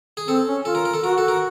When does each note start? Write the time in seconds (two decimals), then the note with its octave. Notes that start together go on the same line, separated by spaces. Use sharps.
0.17 G#4
0.28 C4 A4
0.47 C#4
0.65 F4 A4
0.75 A#4
0.85 A#4
0.94 A4
1.03 F#4 A#4
1.18 A4
1.28 A#4